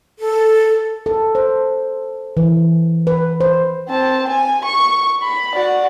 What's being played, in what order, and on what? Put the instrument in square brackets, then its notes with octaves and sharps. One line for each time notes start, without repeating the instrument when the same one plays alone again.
[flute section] A4
[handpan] A4
C5
E3
B4
C5
[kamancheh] C4 A5
G#5
C#6
B5
F#4 D5